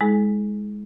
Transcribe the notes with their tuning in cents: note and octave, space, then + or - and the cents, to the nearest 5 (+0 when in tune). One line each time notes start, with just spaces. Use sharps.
G#3 +0 E4 -40 G#4 +45